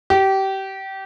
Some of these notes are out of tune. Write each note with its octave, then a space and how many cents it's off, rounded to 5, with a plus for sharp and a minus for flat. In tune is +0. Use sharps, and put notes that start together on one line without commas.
G4 -25